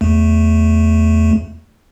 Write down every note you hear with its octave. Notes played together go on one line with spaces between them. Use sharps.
E2 A3